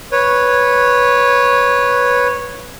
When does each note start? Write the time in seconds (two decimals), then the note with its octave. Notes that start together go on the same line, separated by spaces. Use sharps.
0.12 B4 C#5